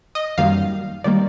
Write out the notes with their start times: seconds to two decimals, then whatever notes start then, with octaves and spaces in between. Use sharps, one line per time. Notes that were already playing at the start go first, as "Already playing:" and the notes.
0.15 D#5
0.38 F#2 D#3 G3 A#3 F5
1.04 D#3 G3 A#3 D5